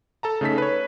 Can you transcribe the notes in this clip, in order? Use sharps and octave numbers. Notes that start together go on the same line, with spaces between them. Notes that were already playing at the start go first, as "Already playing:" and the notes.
A4 A5 A#5
C#3 A3 D#4 A4 B6
B4 C#5